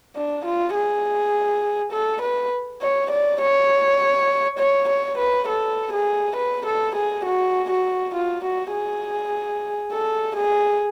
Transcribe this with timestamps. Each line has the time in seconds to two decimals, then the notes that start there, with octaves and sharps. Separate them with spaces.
0.16 D4
0.45 F4
0.75 G#4
1.92 A4
2.22 B4
2.82 C#5
3.11 D5
3.41 C#5
4.59 C#5
4.89 C#5
5.18 B4
5.48 A4
5.93 G#4
6.36 B4
6.66 A4
6.95 G#4
7.25 F#4
7.70 F#4
8.15 F4
8.44 F#4
8.73 G#4
9.92 A4
10.36 G#4